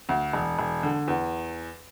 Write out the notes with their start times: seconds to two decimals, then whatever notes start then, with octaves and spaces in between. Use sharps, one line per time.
0.09 D2
0.33 E1
0.59 E1
0.83 D3
1.08 E2